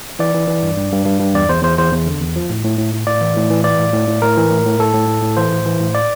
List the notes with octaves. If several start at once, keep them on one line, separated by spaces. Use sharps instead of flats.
E3 D5
E3
E3
G2
G2
G2
G2
G2
E2 D5
E2 C5
E2 C5
E2 C5
E2
D3
E2
F3
A2
A2
A2
A2
A2 D5
E3
A2
E3
E3 D5
A2
A2
A2
A2 A#4
E3
A2
A2
A2 A4
A2
A2
A2
E3 C5
A2
E3
A2
D5